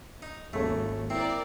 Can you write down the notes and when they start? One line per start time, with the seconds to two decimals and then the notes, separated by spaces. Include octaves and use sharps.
0.22 D#4
0.53 G#1 D#2 A3 C#4 A4 C#5
1.10 C4 E4 A#4 D5